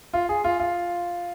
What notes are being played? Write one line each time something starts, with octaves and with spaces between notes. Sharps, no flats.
F4
G#4
F4
F4